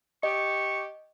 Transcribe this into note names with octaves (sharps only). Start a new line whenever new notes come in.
G4 D#5 C#6